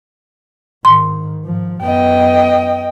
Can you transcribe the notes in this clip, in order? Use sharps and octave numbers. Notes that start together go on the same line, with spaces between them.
G#2 D#3 C6
G#2 F3
F#2 B3 D#5 G5